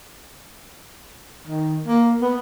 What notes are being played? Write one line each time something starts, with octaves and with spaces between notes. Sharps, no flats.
D#3
A#3
B3